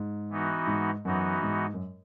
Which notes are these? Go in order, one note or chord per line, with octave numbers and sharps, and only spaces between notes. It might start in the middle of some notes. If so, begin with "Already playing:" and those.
Already playing: G#2
E3 B3 D#4 F#4
G#2
F#2 E3 B3 D#4 F#4
G#2
F#2